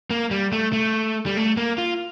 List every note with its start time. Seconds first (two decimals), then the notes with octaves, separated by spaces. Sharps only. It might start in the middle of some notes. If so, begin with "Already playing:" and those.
0.10 A#3
0.31 G3
0.53 A3
0.73 A3
1.26 G3
1.37 A3
1.57 A#3
1.78 F4